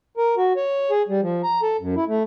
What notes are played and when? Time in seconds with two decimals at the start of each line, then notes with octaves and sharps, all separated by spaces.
0.17 A#4
0.37 F#4
0.56 C#5
0.91 G#4
1.09 G3
1.22 F3
1.43 A#5
1.63 A4
1.80 F#2
1.96 E4
2.08 A3